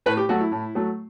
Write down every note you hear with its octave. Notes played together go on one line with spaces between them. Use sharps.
A2 B4
G4
F#3 A3 F#4
E4
A2
F#3 A3